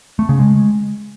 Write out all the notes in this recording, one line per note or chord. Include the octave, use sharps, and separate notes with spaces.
A3
C#3
G#3